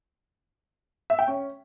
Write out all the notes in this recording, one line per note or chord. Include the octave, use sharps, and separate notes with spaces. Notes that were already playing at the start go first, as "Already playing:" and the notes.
E5
G5
C#4